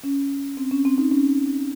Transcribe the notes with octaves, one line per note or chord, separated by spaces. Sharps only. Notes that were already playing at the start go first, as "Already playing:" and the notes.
C#4
C4
C#4
C4
D#4
C#4